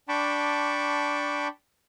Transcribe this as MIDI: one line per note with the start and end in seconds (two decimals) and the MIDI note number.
0.09 1.47 62
0.09 1.47 79
0.09 1.47 81
0.09 1.47 83
0.09 1.47 85
0.09 1.47 86